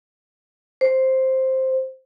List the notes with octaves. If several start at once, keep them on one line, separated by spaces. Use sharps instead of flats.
C5